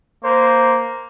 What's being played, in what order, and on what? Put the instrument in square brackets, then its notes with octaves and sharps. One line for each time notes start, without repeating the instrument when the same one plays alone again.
[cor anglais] A#3 [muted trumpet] C5